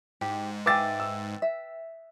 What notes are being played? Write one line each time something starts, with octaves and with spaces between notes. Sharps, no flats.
G#2 G4
B4 E5 F5 G5 G#5 D6 E6 A6
E6
E5